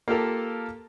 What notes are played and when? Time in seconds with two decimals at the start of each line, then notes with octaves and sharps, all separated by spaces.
0.08 A#3 F4 G4 A4 A#4